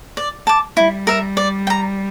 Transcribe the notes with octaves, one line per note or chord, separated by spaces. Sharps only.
D5
A5 D6
G3 E4
A#4 E5
D5
G5
A#5